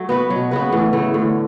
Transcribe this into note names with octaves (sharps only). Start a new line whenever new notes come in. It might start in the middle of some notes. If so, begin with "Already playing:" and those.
Already playing: F#3 A3
B3 F#4 B4
B2 F#3
C#3 B3 F#4 B4
A2 E3
C#3 E3 A3
A2 D3